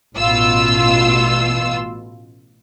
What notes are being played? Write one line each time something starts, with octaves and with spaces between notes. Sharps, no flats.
A1 B2 F4 E6